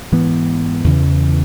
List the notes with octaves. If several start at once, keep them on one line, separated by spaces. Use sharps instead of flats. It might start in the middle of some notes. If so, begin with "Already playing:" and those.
G#2 E3 B3
E2 C#3 E3